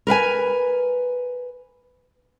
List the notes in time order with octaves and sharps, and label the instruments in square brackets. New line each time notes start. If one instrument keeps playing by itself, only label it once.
[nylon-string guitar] A#4 B4 F5 G#5